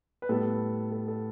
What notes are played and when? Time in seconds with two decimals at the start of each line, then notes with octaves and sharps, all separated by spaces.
0.22 B4
0.29 A2 G3 B3 A4
0.92 A4
1.08 A4